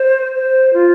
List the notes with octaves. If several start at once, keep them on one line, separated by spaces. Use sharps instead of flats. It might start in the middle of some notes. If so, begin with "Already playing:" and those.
Already playing: C5
C5
F4